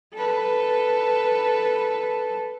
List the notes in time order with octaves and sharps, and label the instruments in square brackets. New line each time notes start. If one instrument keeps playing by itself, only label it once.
[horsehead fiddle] A4 B4